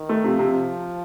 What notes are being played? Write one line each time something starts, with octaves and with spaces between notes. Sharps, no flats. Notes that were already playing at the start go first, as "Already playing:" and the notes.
Already playing: D#3
A3
C3 F3
C3